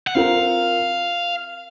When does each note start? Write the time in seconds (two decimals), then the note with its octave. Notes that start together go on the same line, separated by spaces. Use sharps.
0.07 F#5
0.15 C4 F4 A#4 F5